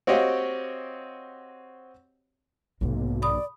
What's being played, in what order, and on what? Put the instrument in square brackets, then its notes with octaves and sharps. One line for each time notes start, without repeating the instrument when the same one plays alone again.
[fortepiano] C4 F#4 G4 C#5 D#5 F5
[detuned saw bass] B1 [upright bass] G#2 C3 [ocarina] A#3
[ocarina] D5 [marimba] B5 D#6